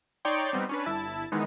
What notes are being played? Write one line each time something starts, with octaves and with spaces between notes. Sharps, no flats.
D#4 C#5 D5 G5 C6
G3 B3 C4 D#4
C#4 D4 B4
G1 E4 A5
D#3 E3 G#3 B3 D#4